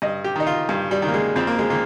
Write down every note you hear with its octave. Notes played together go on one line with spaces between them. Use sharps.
G2 D#5
G4
D#3 D#4
F4
G2
G3
D#3
A#3
G#3
F2 C4
A#3
G#3
D#3 A#3